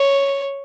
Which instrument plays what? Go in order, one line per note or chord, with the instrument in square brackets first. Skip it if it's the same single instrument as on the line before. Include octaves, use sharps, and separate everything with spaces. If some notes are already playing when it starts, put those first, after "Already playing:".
Already playing: [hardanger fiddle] C#5